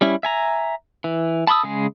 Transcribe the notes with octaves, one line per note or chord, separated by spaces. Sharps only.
G3 C#4 E4
E5 G#5 A#5
E3
A5 B5 C6 D#6 E6
C#3 G#3 G#4